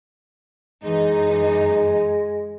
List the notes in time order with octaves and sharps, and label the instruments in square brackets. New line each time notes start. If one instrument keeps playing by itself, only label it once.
[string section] F#2 E3 D#4 [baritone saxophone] G#3